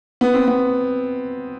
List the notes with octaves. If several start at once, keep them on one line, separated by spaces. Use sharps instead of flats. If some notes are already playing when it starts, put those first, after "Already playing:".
B3
C4
B3